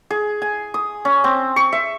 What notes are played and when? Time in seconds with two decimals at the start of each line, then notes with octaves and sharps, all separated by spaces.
0.10 G#4
0.42 G#5
0.74 D#6
1.05 C#4
1.24 C4
1.56 C#6
1.73 E5